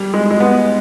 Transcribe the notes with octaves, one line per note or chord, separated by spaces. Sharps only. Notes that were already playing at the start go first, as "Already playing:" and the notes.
Already playing: G3
G#3
G#3
B3